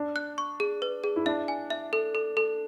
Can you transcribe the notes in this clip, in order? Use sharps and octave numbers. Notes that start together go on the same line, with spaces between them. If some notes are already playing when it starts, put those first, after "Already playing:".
Already playing: D4
F#6
C#6
G#4
B4
G#4
E4
D4 E5
G#5
E5
A4
A4
A4